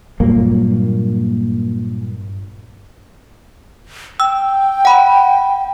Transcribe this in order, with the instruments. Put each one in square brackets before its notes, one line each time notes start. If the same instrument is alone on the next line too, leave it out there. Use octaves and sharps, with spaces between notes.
[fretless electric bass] G2 A#2 F#3 A#3
[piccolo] G5 [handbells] E6
[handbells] F#5 B5